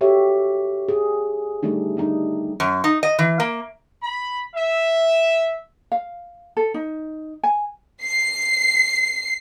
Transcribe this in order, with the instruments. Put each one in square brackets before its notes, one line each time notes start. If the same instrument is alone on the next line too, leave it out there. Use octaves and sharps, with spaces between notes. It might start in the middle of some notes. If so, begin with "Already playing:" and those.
[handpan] F#4 G4 A4 C#5 E5
G#4
G3 A3 D4 D#4
G3 D4 D#4
[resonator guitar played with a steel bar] F#2
D#4
D#5
E3
A#3
[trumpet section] B5
E5
[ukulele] F5
A4
D#4
G#5
[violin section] C7